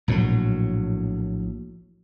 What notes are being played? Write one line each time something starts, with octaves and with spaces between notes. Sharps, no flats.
A#1 A2 F3 F#3